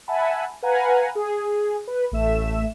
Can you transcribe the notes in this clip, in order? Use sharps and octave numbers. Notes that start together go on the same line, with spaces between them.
E5 F#5 G#5 A5 B5
B4 F5 F#5 G#5 A#5
G#4
B4
A1 A3 E5 E7